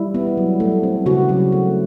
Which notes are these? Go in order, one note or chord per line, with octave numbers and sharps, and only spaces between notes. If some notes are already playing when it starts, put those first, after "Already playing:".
Already playing: G3 E4
B3
F#3
A3
C4
C#3 F#4
F#3
A3